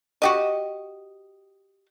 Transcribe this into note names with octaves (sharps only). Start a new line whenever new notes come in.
F#4 G4 D#5